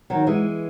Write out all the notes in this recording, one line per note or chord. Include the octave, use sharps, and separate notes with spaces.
D#3 F#3
E3 G#3